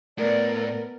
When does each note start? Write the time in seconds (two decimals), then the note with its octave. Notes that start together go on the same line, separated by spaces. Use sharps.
0.18 A2 B3 A#4 D5